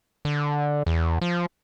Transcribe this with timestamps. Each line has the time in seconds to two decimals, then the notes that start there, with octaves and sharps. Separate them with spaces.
0.25 D3
0.86 E2
1.21 F3